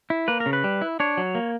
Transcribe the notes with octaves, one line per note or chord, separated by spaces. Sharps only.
E4
A#3 B4
A#4
C#3
B4
G3
E4
D4 C#5
F#3
A#3